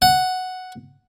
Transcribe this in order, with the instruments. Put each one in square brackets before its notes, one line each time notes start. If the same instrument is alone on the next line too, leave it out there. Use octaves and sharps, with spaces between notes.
[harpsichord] F#5